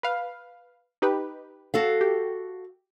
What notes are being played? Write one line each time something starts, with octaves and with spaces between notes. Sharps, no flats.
B4 F5
D#4 G4 B4
F#4 A4 F5
G4